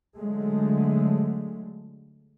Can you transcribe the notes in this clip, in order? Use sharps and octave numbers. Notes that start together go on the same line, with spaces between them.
D3 F#3 G#3 A3